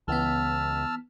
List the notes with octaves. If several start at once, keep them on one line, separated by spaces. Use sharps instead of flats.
C#2 E3 B3 A5 E6 F6